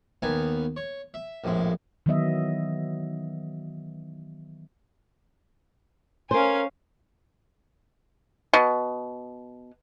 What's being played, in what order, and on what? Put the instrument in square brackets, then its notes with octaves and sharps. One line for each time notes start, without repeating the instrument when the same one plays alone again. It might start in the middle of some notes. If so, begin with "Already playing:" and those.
[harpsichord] D#2 D#3 B3 G#5 A#5
C#5
E5
A#1 F2 A2 G#3
[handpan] D#3 E3 F#3 B3 D#5 E5
[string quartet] C#4 F5 G#5 [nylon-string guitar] A#4 C5
[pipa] B2